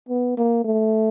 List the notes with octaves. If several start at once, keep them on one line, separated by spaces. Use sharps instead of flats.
B3
A#3
A3